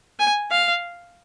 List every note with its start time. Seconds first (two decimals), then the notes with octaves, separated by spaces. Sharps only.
0.20 G#5
0.51 F5